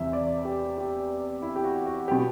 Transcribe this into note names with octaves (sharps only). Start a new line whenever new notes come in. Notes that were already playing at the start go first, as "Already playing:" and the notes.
Already playing: E2 C3 E3 E5
D5
G4
G4
E4
G4
F#4
F#4
G4
B2